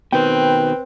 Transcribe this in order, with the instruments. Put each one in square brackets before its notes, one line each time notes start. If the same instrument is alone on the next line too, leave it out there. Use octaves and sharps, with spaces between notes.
[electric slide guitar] B2 D#3 [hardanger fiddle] C4 [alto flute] B4 [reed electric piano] G5